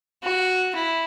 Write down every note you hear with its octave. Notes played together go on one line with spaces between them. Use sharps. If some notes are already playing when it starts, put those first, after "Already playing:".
F#4
E4